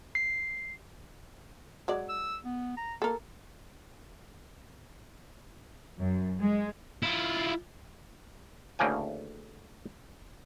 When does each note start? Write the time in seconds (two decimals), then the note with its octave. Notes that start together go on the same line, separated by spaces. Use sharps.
0.15 C7
1.88 F#3 G#3 D5
2.09 E6
2.44 B3
2.77 A#5
3.02 A#3 A4 A#4
5.99 F#2
6.40 G#3
7.03 E4 F4
8.79 D2 A2 C#3 A#3 G5 G#5